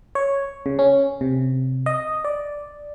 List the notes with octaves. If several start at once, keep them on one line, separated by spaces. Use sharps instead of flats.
C#5
C#3
C#4
C3
D#5
D5